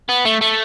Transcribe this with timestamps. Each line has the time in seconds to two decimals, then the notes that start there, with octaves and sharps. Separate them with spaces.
0.09 B3
0.25 A3
0.41 A3